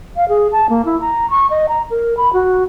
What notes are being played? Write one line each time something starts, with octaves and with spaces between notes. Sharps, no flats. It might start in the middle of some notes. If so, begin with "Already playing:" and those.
F5
G#4
A5
A#3
E4
A#5
C#6
D#5
A#5
A#4
B5
F#4